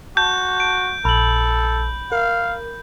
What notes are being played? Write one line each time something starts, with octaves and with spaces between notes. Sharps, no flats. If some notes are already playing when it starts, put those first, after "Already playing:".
F#4 A5 G6
D7
A#1 A4 B5 F#7
A#4 F5